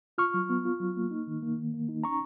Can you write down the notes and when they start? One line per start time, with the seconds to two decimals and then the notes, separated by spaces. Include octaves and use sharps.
0.18 F4 C#6 F6
0.34 F#3
0.50 B3
0.65 F4
0.80 F#3
0.96 A#3
1.11 D#4
1.27 D#3
1.42 A#3
1.58 D#3
1.74 A#3
1.89 D#4
2.04 C#4 A#5 C#6